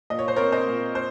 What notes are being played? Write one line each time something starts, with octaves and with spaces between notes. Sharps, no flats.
A#2 D#5
C#5
C5
C4 A#4 C#5
C5 D#5
A#2
C5